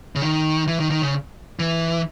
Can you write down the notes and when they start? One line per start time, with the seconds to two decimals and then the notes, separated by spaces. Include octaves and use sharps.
0.16 C#3
0.22 D#3
0.67 E3
0.80 D#3
0.91 D#3
1.02 C#3
1.59 E3